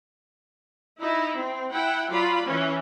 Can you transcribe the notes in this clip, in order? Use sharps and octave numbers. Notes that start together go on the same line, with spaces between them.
D#4 E4
C4
E4 F#5 G5
F#3 F4 D5 B5
E3 C#4